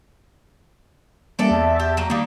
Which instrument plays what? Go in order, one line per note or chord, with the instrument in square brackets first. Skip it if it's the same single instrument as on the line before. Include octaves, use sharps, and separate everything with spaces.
[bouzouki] E3 A4 D5 [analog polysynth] G3 A#3 C#4
[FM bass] E2 [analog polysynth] E5 A5
[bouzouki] G4
F#3 A#3
[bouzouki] D#3 G3 [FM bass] A#3